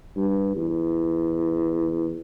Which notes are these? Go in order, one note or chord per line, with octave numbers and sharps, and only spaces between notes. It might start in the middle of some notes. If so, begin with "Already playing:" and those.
G2
E2